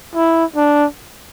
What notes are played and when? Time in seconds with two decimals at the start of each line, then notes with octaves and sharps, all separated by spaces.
0.15 E4
0.56 D4